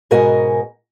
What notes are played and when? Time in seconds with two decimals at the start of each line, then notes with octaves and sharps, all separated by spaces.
0.11 G#2 B2 F#4 A#4 D#5 G#5